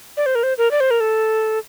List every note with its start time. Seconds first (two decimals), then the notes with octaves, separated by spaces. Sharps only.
0.17 D5
0.26 C5
0.35 A#4
0.43 C5
0.58 A#4
0.71 D5
0.80 C5
0.91 A#4
1.00 A4